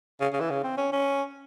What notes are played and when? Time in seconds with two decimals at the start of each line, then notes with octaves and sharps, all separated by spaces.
0.21 C#3
0.33 C#3
0.40 E3
0.50 C#3
0.64 C4
0.78 C#4
0.92 C#4